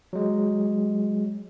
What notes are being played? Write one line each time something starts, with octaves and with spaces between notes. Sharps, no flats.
F#3 G#3